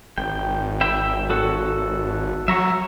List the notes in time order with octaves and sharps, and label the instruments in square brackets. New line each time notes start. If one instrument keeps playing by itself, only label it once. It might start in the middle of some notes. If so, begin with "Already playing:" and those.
[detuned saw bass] G#1 [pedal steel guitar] G5
[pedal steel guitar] E5 G5 B5
F#4 A4 C#5
[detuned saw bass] F#3 [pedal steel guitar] E5 A#5 C#6